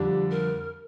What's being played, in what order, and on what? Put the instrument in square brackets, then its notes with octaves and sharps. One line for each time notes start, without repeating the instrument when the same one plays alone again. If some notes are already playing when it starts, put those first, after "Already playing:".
Already playing: [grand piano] F2 D3 G3 D4 [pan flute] G4
[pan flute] A#4